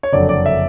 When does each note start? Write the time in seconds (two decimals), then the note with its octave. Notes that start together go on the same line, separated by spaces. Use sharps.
0.03 C#5
0.13 F#1 F2 D3 F#3 D5
0.29 D5
0.46 E5